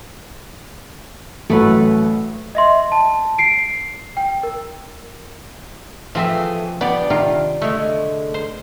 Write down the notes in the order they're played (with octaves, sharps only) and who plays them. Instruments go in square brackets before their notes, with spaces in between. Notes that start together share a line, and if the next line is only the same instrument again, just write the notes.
[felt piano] A1 F#3 [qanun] A3 B4
[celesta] D#5 E5 C6
A5
C7 D7
G5
A#4
[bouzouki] E3 A3 G#4 [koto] F3 C4 E5
[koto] B3 D5 [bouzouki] D4 G4
[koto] C3 D#3 F4
[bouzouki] D3 G#3 [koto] A3
[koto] C5